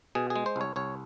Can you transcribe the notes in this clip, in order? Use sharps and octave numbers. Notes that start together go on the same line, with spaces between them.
B2 G#4
G#4
G#3
C5
C2 C#5
C2 C#5